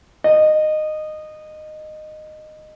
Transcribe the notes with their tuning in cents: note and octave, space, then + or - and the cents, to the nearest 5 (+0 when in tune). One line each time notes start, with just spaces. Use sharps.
D#5 -15